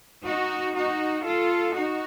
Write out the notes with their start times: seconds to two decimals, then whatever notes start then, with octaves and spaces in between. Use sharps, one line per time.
0.24 D#4 F#4
0.74 D#4 F#4
1.24 F4 A4
1.74 D#4 F#4